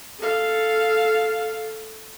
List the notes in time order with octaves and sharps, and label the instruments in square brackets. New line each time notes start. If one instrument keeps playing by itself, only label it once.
[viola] A4 F5